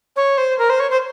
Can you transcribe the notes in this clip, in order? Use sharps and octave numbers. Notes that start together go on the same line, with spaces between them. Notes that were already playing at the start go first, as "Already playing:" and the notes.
C#5
C5
A#4
C5
C#5
C5